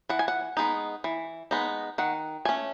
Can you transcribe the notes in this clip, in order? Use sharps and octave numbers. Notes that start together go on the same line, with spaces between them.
E3 F#5
G#5
F#5
G#3 B3 D#4
E3
G#3 B3 D#4
D#3 F#5
A3 C#4 G#5